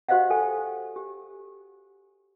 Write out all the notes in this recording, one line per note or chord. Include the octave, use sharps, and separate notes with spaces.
F#4 G4 C5 D#5 F5 F#5
A4 G5 G#5
G4